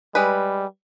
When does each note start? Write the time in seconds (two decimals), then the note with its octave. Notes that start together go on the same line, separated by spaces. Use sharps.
0.15 G3 G#3 B4